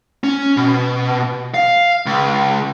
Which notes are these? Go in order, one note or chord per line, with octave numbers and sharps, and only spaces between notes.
C#4
B2
F5
C#2